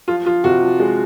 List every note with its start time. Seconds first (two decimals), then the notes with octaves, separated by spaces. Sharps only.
0.08 F3 F4
0.26 F3 F4
0.44 C3 F#4
0.62 F3
0.80 G#3